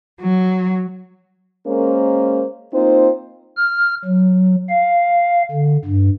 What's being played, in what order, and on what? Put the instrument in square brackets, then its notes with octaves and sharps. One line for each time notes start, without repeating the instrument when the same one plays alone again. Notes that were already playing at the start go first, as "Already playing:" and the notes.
[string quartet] F#3
[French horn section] G#3 A#3 C#4 A#4 C5
A#3 C4 D#4 F4 C5
[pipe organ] F6
F#3
F5
D3
G2